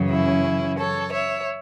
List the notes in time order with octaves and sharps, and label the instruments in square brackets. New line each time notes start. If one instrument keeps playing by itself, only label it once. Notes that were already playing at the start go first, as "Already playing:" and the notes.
Already playing: [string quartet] F#2 C#3 E3
C#4 E4
A4 C#5
C#5 E5